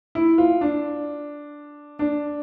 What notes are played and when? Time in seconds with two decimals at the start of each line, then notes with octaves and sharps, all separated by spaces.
0.15 E4
0.38 F4
0.61 D4
1.99 D4